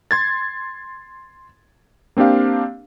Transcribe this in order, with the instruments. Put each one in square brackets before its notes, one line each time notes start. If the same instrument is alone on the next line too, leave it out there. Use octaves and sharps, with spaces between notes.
[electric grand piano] C6 G#6 A6
A#3 C4 D4 G4 F5